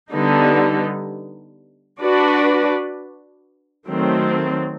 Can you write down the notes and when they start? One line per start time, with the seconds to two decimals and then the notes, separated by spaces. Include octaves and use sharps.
0.12 D3 G3 B3 D#4
2.01 D4 F#4 B4 D5
3.89 D#3 F#3 A3 C4